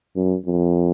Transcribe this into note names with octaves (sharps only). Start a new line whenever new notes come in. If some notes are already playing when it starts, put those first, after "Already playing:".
F#2
F2